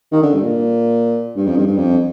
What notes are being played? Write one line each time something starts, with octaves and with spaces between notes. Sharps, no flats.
D#3
D3
G2
A#2
G2
F2
G2
G2
F2